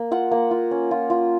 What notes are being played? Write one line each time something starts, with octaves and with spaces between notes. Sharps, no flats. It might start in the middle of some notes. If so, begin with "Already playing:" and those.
Already playing: A#3
F4 F#5
A#3
F4
C#4
F4
F4